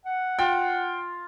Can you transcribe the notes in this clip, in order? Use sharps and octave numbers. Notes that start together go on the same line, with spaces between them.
F#5
F4 G5